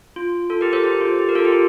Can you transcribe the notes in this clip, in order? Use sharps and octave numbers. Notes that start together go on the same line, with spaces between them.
F4
F4 A4
G4 A#4
A4 C5
G4
F4
G4
A#4
F4 A4
G4
F4